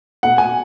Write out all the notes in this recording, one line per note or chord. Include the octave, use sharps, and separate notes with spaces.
B2 A3 F#5
G#5